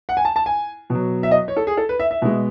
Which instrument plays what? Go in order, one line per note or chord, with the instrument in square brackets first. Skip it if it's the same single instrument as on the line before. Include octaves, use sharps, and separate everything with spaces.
[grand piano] F#5
G#5
A5
A5
G#5
B2 F#3
E5
D#5
C#5
A4
G#4
A4
B4
E5
E5
B2 G#3